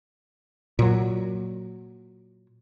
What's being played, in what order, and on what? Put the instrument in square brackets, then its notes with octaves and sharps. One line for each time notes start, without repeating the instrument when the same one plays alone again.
[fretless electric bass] A#2 F#3